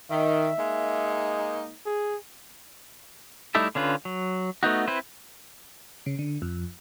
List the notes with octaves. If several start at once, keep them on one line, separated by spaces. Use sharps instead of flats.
D#3 E5
G#3 A#3 D#4
G#4
G3 A3 D#4 E4 A4
D3 C#4 F4 B4
F#3
A3 B3 D#4 F#4
C4 E4 B4 C5
C#3
D3
F2